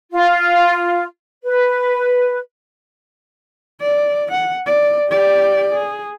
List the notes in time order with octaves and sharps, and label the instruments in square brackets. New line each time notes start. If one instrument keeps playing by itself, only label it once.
[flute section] F4
B4
[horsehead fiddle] D5
F#5
D5
G4 D5
G#4